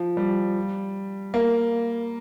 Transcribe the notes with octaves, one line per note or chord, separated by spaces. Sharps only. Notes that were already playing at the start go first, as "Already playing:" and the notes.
Already playing: F3
G3
A#3